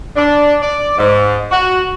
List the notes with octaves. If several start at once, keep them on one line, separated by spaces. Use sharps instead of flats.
D4
D5
G#2
F#4